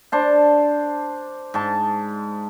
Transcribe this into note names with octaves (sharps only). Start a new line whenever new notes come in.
D4 C5 A5
G#2 A5